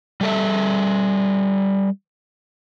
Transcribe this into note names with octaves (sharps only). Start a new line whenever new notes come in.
G3 A4 E5